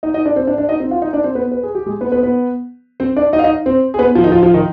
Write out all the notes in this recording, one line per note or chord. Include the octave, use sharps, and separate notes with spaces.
D#4 D#5
D#4 D#5
D4 D5
C4 C5
D4 D5
D4 D5
D#4 D#5
C4 C5
F4 F5
D#4 D#5
D4 D5
C4 C5
B3 B4
B4
G#4
G4
G#3 G#4
B3 B4
B3 B4
B3 B4
C4 C5
D4 D5
D#4 D#5
F5
D#4 D#5
C4 C5
G#4
B3 B4
F3 F4
D#3 D#4
F3 F4
F3 F4
D#3 D#4